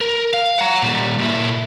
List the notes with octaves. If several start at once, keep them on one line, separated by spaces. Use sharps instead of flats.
A#4
F5
F#5 A#5
A#2 G3
A#2 E4